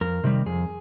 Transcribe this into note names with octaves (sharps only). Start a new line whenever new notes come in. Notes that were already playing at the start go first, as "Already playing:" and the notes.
F2 A#4
C3 D#3 G3
F2 G#4